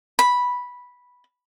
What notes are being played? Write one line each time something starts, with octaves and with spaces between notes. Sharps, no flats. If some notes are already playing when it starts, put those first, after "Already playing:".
B5